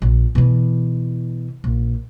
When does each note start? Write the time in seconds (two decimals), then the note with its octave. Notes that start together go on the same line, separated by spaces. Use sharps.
0.02 A#1
0.35 B2 E3
1.64 A#1